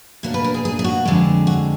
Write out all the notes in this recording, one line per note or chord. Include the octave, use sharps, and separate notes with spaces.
B2 A#3 D4
B4
A#4
G#4
G#4
G#4
F#4
F2 D3 G#3
F#4